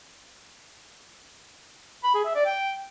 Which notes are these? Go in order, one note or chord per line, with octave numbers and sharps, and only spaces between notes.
B5
G#4
E5
D5
G5